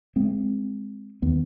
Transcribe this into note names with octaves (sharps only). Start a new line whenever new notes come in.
G#3 C4
D#2 B3